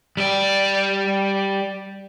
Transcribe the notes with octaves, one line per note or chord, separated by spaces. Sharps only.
G3 D5